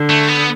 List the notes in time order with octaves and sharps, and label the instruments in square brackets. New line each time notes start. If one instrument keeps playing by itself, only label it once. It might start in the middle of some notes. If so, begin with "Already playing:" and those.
Already playing: [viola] D3
[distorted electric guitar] A3
B3